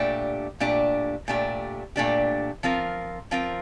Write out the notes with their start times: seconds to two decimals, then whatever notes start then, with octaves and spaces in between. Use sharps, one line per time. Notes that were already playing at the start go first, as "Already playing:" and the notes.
Already playing: A#2 A3 D4 G4
0.60 A#2 A3 D4 G4
1.28 A#2 A3 D4 G4
1.96 A#2 A3 D4 G4
2.63 F3 C4 F4 A#4
3.31 F3 C4 F4 A#4